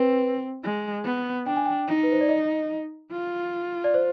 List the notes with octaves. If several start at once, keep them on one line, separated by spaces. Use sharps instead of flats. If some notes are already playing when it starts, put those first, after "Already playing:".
Already playing: C4 B4
G#3
B3
D4 G5
G#5
G5
D#4
B4
C5
D5
D#5
F4
D5
C5